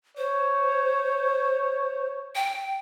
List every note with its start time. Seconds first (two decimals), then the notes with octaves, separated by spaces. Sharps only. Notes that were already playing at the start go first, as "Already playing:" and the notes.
0.17 C5 C#5
2.35 G5